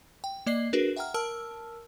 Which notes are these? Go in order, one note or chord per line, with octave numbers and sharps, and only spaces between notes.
G5
A#3 D5 D#5 C7
D4 F#4 G#4 A#4 B4
E5 F#5 G5 A#5 F6
A#4 A5 E6 F6